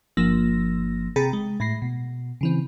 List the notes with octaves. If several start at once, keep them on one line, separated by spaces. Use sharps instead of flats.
G1 F3 A#3 E6 A#6
C3 G#4 G5 A#5 B5 A6
G#3
A2 B5 A#6 C7
B2
C#3 E3 C4